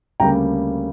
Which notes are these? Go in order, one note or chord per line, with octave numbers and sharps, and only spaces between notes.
D2 C#3 G3 A#3 G5 A#5